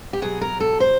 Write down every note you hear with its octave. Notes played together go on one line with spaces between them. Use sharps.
G4
B2 F#3 G#4
A#4
A4
C5